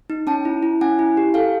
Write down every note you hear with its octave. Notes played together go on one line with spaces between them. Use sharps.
D#4
C#4 G5 A5
E4
E4
C#4 F#5 G#5
E4
G4
A4 F5 G5